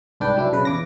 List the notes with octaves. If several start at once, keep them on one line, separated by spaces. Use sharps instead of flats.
C2 G#2 D4 B4 G5
F#3 D4 E4
B1 C#3 B4
E2 D6 A#6